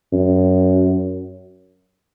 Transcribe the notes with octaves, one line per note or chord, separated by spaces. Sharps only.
F#2